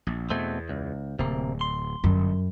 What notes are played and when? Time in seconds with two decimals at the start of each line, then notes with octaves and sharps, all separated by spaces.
0.07 A#1
0.30 E2 B2 A3 C4
0.69 C#2
1.19 D1 C3 A#3
1.61 C6
2.04 G1 F#2